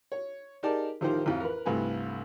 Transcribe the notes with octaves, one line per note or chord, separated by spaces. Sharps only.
C#5
D#4 G4 G#4 A#4 D5 A5
A1 D#3 F3 G4 A#4 C5
A1 F2
A#4 B4
C2 G2 A3 B4 G#5